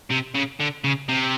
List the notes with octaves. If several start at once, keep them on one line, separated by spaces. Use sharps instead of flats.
C3
C#3
D3
C#3
C3